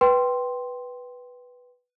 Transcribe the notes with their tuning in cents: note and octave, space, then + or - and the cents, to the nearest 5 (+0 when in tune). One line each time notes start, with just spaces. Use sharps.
B4 +0 G5 -10 C6 +0